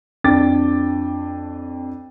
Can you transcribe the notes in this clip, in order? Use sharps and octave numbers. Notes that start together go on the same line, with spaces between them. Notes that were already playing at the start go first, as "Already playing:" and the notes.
F2 D4 G5 D6 A6